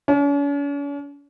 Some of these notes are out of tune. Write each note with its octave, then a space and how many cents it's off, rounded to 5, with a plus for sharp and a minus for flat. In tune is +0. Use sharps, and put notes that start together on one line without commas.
C#4 +45